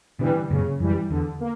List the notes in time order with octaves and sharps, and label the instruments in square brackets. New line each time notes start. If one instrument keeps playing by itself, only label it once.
[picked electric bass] B2 D3 [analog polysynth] E3 G3
[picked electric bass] F#2 A#2 [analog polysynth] C#3
[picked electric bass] F#2 [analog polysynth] E3 G3
[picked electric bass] E2 [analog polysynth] D3
[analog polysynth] A#3